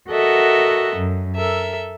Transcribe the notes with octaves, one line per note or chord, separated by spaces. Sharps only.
F#4 A4 A#4 D#5 E5 F#5
F#2
A4 A#4 E5